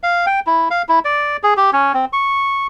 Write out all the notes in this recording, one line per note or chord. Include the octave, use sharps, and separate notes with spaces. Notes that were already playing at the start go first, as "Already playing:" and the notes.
F5
G5
E4
F5
E4
D5
G#4
G4
C#4
C4
C#6